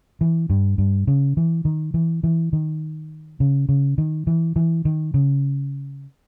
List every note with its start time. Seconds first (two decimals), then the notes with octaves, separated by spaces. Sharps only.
0.21 E3
0.50 G2
0.78 G2
1.07 C#3
1.37 E3
1.65 D#3
1.94 E3
2.24 E3
2.53 D#3
3.40 C#3
3.69 C#3
3.98 D#3
4.27 E3
4.56 E3
4.85 D#3
5.14 C#3